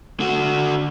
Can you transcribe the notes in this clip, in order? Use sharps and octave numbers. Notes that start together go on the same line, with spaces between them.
D3 F#4